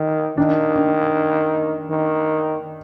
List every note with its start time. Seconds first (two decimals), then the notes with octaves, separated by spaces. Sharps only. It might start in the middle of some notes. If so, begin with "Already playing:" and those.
Already playing: D#3
0.37 D#3 D4
0.76 D4
1.90 D#3